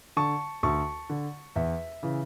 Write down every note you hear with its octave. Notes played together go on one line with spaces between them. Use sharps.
D3 A5 C#6
D2 A5 C#6
D3
E2 E5
C#3 E3